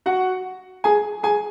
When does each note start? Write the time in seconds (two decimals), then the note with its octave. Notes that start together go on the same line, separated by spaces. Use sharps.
0.06 F#4 F#5
0.84 G#4 G#5
1.23 G#4 G#5